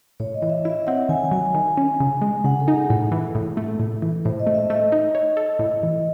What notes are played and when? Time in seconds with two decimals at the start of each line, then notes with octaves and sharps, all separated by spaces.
0.20 A2 C#5
0.34 D#5
0.42 E3
0.50 E5
0.65 E4 E5
0.87 C4 F#5
1.09 D#3 G#5
1.25 G#5
1.31 F#3
1.40 G#5
1.55 D#3
1.77 C#4
2.00 C#3
2.22 G#3
2.44 C#3 F#5
2.60 A4
2.68 D#4
2.74 G#4
2.90 A2 A4
3.12 E3
3.35 A2
3.57 A3
3.79 A2
4.02 E3
4.25 A2 C5
4.40 D#5
4.47 A3
4.55 E5
4.70 A3 D#5
4.92 D#4
5.15 C#5
5.37 A4
5.59 A2
5.83 E3